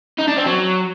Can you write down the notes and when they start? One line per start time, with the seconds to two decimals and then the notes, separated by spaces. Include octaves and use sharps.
0.19 D#4
0.28 D4
0.37 C4
0.46 F#3